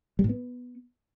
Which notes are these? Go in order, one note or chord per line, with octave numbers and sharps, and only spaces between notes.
G3
A2
B3